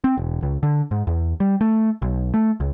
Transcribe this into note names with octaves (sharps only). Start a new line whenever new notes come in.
C4
E1
C#2
D3
G#2
E2
G3
A3
B1
A3
C#2